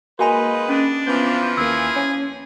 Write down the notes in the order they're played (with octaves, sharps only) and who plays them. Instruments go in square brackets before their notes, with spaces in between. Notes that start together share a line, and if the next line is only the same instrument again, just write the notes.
[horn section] G#3 D#4 B4 [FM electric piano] A#3 [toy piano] F#4 G#5 B5
[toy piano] C#4 [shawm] D4
[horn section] E3 F3 [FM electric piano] B3 G6
[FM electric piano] D#2 A#3 [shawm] G#4 [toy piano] E6
[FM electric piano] C#4